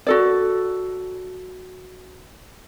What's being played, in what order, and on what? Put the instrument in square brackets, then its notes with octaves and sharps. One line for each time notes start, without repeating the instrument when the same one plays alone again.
[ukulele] F#4 A4 D5